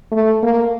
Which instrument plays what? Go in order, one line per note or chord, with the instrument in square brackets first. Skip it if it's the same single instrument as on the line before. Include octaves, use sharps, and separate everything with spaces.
[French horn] A3
A#3